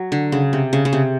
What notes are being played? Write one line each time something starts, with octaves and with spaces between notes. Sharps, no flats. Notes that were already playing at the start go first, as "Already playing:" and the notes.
Already playing: F#3
D3
C#3
C3
C#3
C#3
C3